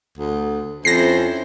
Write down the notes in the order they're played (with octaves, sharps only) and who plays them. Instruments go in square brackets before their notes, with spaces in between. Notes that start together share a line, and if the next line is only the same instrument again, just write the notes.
[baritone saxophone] D2
[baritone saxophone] F2 [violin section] C#4 E4 C5 [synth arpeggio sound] A#6 C7